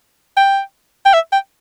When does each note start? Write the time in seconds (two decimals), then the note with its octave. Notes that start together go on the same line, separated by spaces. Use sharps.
0.37 G5
1.06 G5
1.14 E5
1.32 G5